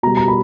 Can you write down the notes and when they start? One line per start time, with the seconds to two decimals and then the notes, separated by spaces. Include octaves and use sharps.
0.03 B2 A#5
0.07 G3
0.17 A#5
0.28 B5